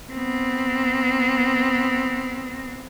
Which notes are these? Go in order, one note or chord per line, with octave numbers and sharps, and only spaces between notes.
B3 C4